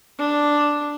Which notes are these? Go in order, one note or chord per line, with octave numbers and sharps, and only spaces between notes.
D4